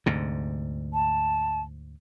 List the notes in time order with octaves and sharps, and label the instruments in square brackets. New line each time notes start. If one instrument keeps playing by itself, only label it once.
[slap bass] D2 G#2 C3
[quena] A5